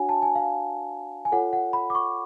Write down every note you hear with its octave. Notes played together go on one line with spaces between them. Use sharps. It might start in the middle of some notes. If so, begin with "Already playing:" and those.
Already playing: D4 F#4 C#5 F#5 G#5
A5
G#5
F5
G#5
F4 A4 C#5 F#5
F#5
B5
D6
C#6